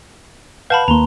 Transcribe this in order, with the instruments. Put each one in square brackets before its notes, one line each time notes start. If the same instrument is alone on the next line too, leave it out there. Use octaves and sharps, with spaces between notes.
[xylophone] B4 A5 B5 [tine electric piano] F5 F#5 G6
[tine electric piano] D#2 A#3 [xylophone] A#5 C6